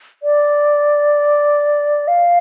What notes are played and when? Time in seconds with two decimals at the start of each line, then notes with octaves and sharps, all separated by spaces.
0.23 D5
2.08 F5